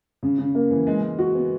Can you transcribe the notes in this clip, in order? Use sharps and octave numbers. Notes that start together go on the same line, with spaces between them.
C#3
C#3
A#3
E3
G#3
G#3
F#4
B3